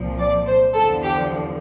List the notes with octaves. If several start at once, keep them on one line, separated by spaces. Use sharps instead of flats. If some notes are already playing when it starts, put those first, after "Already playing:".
Already playing: C2 A#2 F3
D5
C5
E2 D3 F3 A4
G4